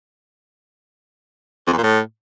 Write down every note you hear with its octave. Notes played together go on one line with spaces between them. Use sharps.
F2
E2
A#2
A2